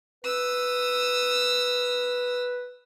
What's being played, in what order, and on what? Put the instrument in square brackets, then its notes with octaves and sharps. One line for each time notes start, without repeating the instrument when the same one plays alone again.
[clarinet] B4 [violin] D#6 E6